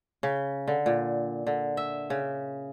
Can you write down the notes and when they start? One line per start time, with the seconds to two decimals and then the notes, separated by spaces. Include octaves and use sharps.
0.23 C#3
0.67 D3
0.86 A#2
1.46 D3
1.77 E5
2.10 C#3